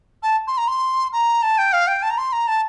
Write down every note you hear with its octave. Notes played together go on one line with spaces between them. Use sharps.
A5
C6
A#5
C6
A#5
A5
G5
F5
G5
A5
A#5
C6
A#5
A5